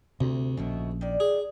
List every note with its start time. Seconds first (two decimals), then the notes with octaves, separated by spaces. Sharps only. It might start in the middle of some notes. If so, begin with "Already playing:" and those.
0.21 D2 C3
0.57 A#1 B2 D#3 C#4 E4
1.01 D#3 D5
1.20 G#4